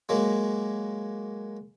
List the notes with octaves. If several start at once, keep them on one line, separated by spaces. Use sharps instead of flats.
F#3 G#3 A#3